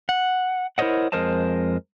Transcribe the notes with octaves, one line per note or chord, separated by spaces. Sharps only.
F#5
E4 A#4 C5 C#5 D#5 F#5
F2 G#3 A#4 C5 D#5 A5